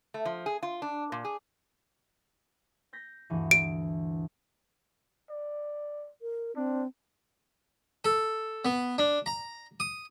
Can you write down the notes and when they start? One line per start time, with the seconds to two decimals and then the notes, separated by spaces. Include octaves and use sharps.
0.14 A3
0.25 F3
0.46 G#4
0.63 F4
0.82 D4
1.12 A#2
1.25 G#4
2.93 G6 A#6 B6
3.30 D2 G2 E3
3.51 D7
5.30 D5
6.22 A#4
6.56 C4 D4
8.05 A4
8.65 B3
8.98 D4
9.26 A#5
9.80 D#6